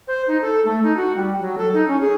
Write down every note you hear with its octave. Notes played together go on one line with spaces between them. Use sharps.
C5
D#4
A4
A3
D#4
F#4
G3
F#3
A4
D#4
C#4
G#4